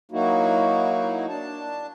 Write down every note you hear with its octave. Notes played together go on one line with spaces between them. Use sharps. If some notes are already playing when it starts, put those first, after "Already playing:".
F#3 A#3 D#4 E4 F#4
D4 A5